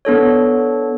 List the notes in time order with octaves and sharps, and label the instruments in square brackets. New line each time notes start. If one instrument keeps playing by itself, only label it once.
[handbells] B3 D4 A4 C#5